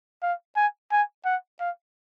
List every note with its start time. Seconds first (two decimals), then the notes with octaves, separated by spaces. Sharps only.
0.22 F5
0.56 G#5
0.91 G#5
1.25 F#5
1.60 F5